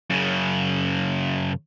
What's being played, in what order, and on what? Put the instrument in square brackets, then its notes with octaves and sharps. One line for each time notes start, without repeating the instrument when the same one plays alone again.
[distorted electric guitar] F#2 C#3